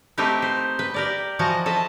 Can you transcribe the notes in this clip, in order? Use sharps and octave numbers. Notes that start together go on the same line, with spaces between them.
A3 C4 D#4 G4 A#4 B4
C5
B4
G4 A#4 D5
E3 F3 F#4 D#5 A#5
A4 D#5 E5